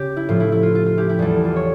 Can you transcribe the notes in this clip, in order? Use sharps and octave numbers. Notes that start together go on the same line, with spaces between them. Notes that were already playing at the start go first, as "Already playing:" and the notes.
Already playing: C#3 G4
E4
A2 F3 F4
E4
E4
F4
F4
F4
E4 G4
E4 G4
E2 E3 G3 F4 A4
F4 A4
C#5